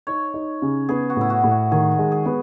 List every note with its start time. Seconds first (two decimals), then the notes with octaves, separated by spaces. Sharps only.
0.07 D#4 C#5
0.34 D#4
0.62 C#3
0.89 B3 G#4
1.10 F#4
1.16 A2 E4
1.30 F#4
1.44 A2
1.51 F#4
1.71 D#3 G#4
1.98 G#3
2.12 G#4
2.26 B3